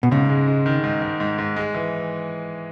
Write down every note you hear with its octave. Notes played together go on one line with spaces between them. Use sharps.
B2
G#2 C#3
G#3
G#3
D#3
G#2
G#2
G#2
G#2
G#3
E3